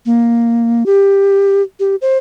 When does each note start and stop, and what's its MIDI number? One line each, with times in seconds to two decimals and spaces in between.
0.06 0.86 58
0.86 1.62 67
1.80 1.96 67
2.02 2.17 72